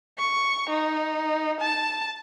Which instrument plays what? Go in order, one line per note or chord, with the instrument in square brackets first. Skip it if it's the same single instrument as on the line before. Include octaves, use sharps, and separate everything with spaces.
[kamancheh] C#6
D#4
A5